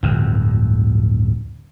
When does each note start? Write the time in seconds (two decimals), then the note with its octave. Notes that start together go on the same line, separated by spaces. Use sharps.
0.03 D1 G1 F2